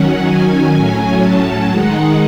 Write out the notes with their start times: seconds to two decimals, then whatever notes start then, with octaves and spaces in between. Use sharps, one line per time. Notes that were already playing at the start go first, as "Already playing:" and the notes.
Already playing: D#3 F#3 C#4 F#5
0.25 G#5
0.74 A2 F#3 C#4
1.21 A5
1.69 D#3 G#3 D#4 F#5